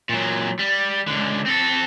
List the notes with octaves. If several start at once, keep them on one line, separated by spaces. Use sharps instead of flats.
A#2 F#3
G3
C#2 D3
C4 A4